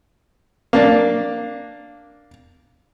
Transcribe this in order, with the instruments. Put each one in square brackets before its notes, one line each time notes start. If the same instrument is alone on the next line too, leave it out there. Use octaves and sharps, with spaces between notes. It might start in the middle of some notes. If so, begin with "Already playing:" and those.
[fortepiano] A#3 D4